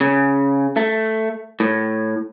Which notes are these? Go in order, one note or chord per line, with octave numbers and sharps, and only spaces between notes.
C#3
A3
A2